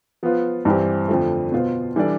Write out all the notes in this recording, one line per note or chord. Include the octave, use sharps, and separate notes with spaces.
F3 B3 F4 B4
G2 E3 G3 C4 G4
F2 D3 F3 A3
B2 B3 F4 C5
E3 G3 D4 A4 D5